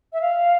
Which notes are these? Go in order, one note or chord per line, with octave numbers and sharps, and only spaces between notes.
E5
F5